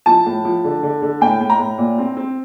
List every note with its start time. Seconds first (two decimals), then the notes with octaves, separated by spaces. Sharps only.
0.06 F3 A5
0.26 A2
0.45 F3
0.64 D3
0.83 D3
1.02 D3
1.21 A2 G5
1.41 A2
1.50 A#5
1.59 A2
1.78 A#2
1.98 C4
2.17 C4